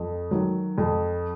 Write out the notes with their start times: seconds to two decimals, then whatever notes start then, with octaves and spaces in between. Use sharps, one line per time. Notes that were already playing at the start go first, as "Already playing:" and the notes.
Already playing: F2
0.31 D#3 F#3
0.78 F2